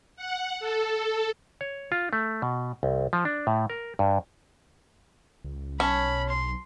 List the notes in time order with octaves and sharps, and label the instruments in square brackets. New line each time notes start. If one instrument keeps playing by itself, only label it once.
[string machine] F#5
A4
[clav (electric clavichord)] C#5
F4
A3
B2
C2
F3
D4
A2
A#4
G2
[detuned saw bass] C#2
[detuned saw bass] B1 [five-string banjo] C#4 [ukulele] A5 [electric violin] B5
[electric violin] C6